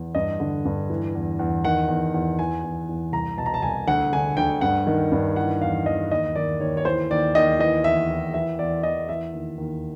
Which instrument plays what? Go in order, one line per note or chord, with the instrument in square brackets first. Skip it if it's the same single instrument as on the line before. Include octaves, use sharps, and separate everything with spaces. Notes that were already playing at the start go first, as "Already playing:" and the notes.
Already playing: [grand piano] E2
G2 D#5
D3
G2
E3
E2
E2
D#3 F#5
E2
E2
E3 G#5
E2
E2
C2 A#5
B2 A5
A#5
A5
C2 G#5
D2 F#5
D3 G#5
D2 G5
G2 F#5
D#3
G2
E3 F#5
E2 F5
E2 D#5
D#2 D#5
D#3 D5
D#2 C#5
C#5
E3 C5
D#2 D5
D#2 D#5
E3 D#5
E2 E5
E2
E3 E5
E2 D5
E2 D#5
E3 E5
D#2
D#2